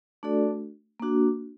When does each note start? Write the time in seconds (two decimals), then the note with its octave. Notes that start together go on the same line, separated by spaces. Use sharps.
0.23 A3 D4 F#4 A4 D5
1.00 A#3 D4 F#4